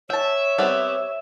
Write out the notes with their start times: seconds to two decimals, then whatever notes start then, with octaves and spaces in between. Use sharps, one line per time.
0.10 C#5 E5 G5 A5
0.58 G3 B3 C4